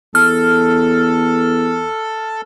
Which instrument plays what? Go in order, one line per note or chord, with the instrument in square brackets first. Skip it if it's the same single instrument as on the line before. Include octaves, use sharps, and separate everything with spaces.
[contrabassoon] E2 [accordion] A4 [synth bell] F6